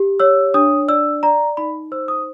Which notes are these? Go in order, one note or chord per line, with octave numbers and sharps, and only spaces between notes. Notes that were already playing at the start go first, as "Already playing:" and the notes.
Already playing: G4
C#5 E6
D4 D#6
D5 E6
D5 A#5
D#4 B5
C5 E6
D#6